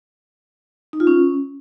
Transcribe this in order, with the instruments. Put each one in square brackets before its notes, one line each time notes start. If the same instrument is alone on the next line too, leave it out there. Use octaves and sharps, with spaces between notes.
[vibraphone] D#4
F4
C#4